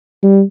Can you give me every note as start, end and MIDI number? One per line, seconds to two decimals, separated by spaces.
0.23 0.42 55